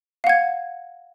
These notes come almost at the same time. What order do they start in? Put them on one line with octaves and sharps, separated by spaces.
F5 F#5 G#6